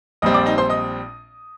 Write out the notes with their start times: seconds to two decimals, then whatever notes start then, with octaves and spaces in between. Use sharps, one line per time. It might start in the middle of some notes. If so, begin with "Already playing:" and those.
0.22 A#1 A#2 G3 C4 D#5 D#6
0.34 D5 D6
0.46 D#4 D#5
0.58 C5 C6
0.69 D#5 D#6